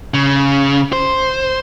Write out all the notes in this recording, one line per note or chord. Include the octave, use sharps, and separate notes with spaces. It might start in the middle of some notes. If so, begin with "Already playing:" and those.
C#3
C5